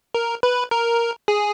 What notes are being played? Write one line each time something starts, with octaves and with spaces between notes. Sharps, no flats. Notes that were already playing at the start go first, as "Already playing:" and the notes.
A#4
B4
A#4
G#4